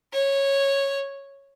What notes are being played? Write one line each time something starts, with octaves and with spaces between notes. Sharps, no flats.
C#5